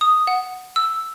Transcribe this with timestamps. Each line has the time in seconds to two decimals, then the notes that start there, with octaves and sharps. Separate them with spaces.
0.01 D#6
0.27 F#5
0.76 E6